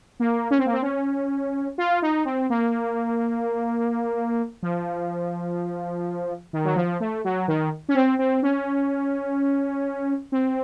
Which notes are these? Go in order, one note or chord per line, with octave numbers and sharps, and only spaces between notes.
A#3
C#4
C4
A#3
C4
C#4
F4
D#4
C4
A#3
F3
D#3
F#3
F3
A3
F#3
D#3
C#4
C4
C4
C#4
C4